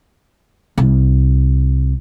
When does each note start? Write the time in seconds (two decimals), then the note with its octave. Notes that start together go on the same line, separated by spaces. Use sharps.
0.78 C2